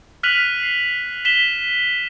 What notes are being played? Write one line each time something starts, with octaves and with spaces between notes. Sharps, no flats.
F6 F#6 B6 D#7 F7 F#7
C7
B6 E7 G7